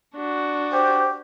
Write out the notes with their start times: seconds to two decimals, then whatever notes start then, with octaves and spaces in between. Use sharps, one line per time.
0.15 D4 F#4
0.72 G4 C5